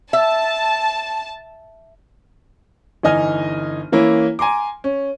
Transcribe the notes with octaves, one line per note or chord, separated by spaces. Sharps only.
E5 A5
G1 E3 D#4 D#5 G#5 F6
E3 A#3 C#4 E4
G#5 A#5 C6 D6
C#4